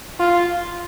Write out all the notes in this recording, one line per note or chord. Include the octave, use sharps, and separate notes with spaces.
F4